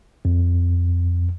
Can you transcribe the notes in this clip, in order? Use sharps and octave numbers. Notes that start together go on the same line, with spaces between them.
F2